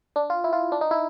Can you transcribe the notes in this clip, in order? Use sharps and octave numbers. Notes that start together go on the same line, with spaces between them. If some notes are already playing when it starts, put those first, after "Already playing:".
D4
F4
E4
F4
D4
D#4
E4